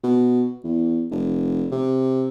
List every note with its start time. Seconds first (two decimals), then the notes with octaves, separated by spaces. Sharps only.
0.04 B2
0.64 E2
1.11 F1
1.71 C3